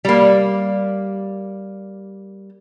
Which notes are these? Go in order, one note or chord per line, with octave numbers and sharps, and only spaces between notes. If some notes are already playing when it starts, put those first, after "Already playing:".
G3 A#3